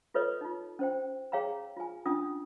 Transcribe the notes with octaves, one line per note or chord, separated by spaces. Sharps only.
F4 A4 B4 C#5 D#5
D#4 F4
C#4 C5 G5
G#4 C#5 F5 G5 A#5
F4 G#5
C#4 D4 F4 D#6